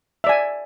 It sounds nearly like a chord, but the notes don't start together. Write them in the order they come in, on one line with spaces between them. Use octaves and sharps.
E5 D5 G#5